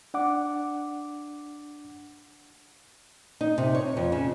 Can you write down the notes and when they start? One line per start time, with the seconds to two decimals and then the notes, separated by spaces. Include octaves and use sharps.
0.14 D4 F#5 D6
3.41 D#4
3.58 C3
3.75 C#5
3.97 F2
4.12 C#3